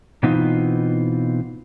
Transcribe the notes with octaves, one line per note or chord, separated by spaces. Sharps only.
B2 E3 B3 C4 D#4 F4